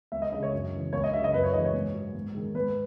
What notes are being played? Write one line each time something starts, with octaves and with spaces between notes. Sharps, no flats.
C#2 E5
D#5
C#3 G#3 D#5
C#5
F#2
C#3 E3
C#2 C#5
D#5
C#3 F#3 E5
D#5
F#2 B4
C#5
C#3 E3 G#3 D#5
C#5
G#2
F#3
G#2
D#3 G#3
G#2 B4